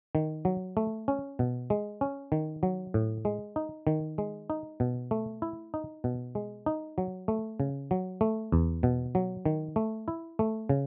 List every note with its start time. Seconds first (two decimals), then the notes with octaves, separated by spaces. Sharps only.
0.15 D#3
0.45 F#3
0.77 A3
1.08 C#4
1.39 B2
1.70 G#3
2.01 C#4
2.32 D#3
2.63 F#3
2.94 A2
3.25 G#3
3.56 D#4
3.87 D#3
4.18 G#3
4.50 D#4
4.80 B2
5.11 A3
5.42 E4
5.74 D#4
6.04 B2
6.35 G#3
6.66 D#4
6.98 F#3
7.28 A3
7.60 C#3
7.91 F#3
8.21 A3
8.52 E2
8.83 B2
9.15 F#3
9.45 D#3
9.76 A3
10.08 E4
10.39 A3
10.69 C#3